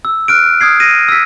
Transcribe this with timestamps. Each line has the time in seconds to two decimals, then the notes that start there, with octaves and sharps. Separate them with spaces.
0.05 E6
0.28 F6 F#6 D7
0.61 D#6 F6 G#6 C7
0.80 A#6 D#7
1.09 E6 B6